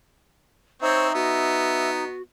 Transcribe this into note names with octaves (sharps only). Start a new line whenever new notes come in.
C4 D#4 C5 C#5 E5
B3 F#4